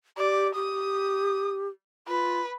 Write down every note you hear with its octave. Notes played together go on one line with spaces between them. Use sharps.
G4 D5
G4 D#6
F4 B4